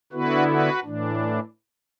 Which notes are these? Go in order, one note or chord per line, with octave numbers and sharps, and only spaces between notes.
D3 B3 E4 F#4 B4
F#4 B4
A2 E3 D4